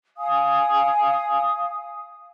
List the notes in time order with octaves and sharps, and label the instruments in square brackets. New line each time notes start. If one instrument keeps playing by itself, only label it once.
[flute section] F5 G#5 D#6